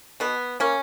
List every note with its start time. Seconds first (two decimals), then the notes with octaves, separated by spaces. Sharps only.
0.20 B2 B3
0.60 A#3 C#4